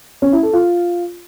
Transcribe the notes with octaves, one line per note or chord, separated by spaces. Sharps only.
C#4
E4
A4
F4